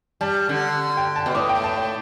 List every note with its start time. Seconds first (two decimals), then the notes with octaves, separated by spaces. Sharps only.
0.21 G3 A5
0.49 D3
0.97 G5
1.16 A5
1.26 B2
1.34 A2 D6
1.49 G5
1.64 A5
1.78 G5